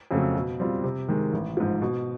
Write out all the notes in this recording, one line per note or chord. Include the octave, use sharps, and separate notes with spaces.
F2 C#3 F#3 A3
B2
G3 C4 F4
C3
D#3 G#3
A1
G#2 F3
B2